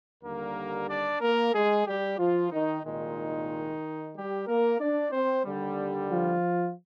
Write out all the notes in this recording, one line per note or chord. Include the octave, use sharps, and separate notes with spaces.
D#2 D3 G3 A#3 A#4
D4 D5
A#3 A#4
G#3 G#4
G3 G4
F3 F4
D#3 D#4
C2 A#2 D#3 G#3 D#4
G3 G4
A#3 A#4
D4 D5
C4 C5
D#2 D3 G3
F3 F4